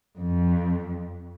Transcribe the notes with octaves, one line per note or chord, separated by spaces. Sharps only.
F2